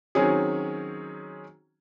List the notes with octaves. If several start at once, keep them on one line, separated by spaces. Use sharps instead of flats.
D#3 F#3 C4 C#4 G#4